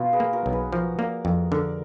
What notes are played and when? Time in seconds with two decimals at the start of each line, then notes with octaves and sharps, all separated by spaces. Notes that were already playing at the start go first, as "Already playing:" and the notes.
Already playing: B2 F4
0.13 G#4 B4
0.20 A#3
0.33 F#4 A#4
0.46 B1
0.52 G#4 B4
0.72 F3 F#4 A#4
0.98 A#3 A#4 D5
1.25 F2
1.51 D3 A#4 D5